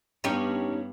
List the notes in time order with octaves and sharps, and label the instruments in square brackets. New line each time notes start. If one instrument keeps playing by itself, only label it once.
[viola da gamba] G2 B3 [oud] C#4 D#4 G4